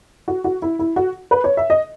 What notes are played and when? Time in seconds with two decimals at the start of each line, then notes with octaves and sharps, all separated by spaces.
0.28 F#4
0.44 F#4
0.62 E4
0.79 E4
0.96 F#4
1.31 B4
1.44 C#5
1.57 E5
1.70 D#5